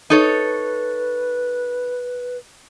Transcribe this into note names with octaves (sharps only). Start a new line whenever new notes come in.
D#4 A4 B4 C#5